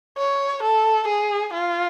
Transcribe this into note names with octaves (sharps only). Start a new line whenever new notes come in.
C#5
A4
G#4
F4